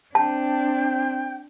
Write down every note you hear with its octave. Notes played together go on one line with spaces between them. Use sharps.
C4 D4 G5 A5